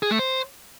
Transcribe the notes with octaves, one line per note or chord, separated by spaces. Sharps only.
G#4
A3
C5